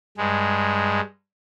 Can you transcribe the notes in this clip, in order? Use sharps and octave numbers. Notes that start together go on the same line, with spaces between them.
G2 G#3